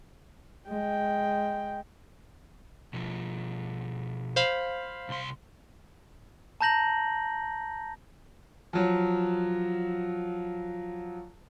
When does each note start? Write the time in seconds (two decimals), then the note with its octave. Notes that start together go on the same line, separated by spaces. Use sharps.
0.70 G#3 G5
2.93 B2 F3
4.36 C5 F5 B5
5.09 C2 C6
6.61 A5 A#5 G6 A#6 F#7
8.73 F3 F#3